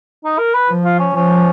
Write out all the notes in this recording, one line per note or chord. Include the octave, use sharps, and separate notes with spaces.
D#4
A#4
B4
F3
F4
C#4
F3 C#4